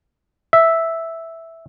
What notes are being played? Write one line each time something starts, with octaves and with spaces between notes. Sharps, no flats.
E5